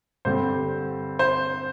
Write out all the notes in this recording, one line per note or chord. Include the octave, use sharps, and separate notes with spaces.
G2 D3 G3 C4 C5
C5